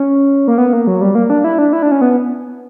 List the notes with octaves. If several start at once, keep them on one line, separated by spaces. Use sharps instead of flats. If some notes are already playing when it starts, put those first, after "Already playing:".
Already playing: C#4
A#3
B3
A#3
F#3
G3
A#3
D4
E4
D4
E4
D4
C#4
B3